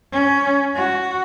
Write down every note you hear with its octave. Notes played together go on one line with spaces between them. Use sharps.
C#4
F#4